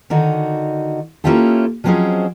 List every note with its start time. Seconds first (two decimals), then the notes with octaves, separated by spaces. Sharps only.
0.10 D3 D#3 D#4 F#4
1.24 A#3 C#4 E4 F4 G4 A4
1.84 F3 F#3 C4 C#4 G#4 D#5